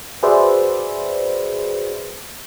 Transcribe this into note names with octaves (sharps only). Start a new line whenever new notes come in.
F#4 G#4 B4 C5 D5 E5